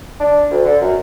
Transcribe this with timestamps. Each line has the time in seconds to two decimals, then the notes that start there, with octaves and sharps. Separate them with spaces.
0.20 D4
0.50 D2
0.65 D3
0.81 F#2